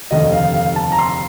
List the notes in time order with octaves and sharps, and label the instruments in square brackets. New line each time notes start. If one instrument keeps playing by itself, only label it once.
[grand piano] F1 D#2 D3 D#5
F5
F5
A5
A#5
C6